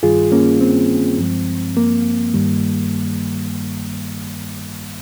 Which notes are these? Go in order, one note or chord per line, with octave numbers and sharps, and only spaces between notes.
G2 D#3 G3 F4 G#4
A#3 C#4
C4
G2 F3 G#3
A#3
G2 D#3 G3